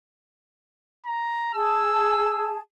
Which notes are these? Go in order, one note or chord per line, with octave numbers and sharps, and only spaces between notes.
A#5
G#4 A5 E6